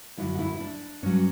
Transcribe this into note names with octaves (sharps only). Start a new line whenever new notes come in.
F#2 D3 F#3 E4
F#4
E4
E4
D4
G2 F#3 C#4